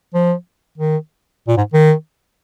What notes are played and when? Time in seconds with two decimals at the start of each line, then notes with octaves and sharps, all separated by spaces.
0.14 F3
0.78 D#3
1.48 A#2
1.57 G#2
1.73 D#3